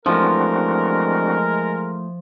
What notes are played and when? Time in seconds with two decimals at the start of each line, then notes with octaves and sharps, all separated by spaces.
0.06 E3 F3 G#3 A3 C4 D4 F#4 A#4